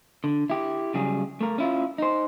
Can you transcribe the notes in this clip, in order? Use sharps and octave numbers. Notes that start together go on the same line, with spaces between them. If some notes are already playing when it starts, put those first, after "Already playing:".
D3
E4 G4
C#3 F#3 G3 G#4
A3 A#4
C#4 E4 F4
D#4 C5